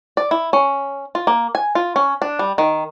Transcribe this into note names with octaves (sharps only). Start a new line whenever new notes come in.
D5
E4
C#4
F4
A#3
G#5
F4
C#4
D4
G3
D#3